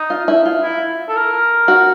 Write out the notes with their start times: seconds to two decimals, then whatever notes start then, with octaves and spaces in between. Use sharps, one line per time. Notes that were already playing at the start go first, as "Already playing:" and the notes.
Already playing: D#4
0.10 F4
0.28 E4
0.46 F4
0.63 E4
1.09 A4
1.16 A#4
1.68 F#4